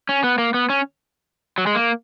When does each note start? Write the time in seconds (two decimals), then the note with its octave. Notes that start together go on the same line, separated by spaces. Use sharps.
0.09 C#4
0.24 B3
0.38 A#3
0.54 B3
0.70 C#4
1.58 F#3
1.67 G#3
1.75 A#3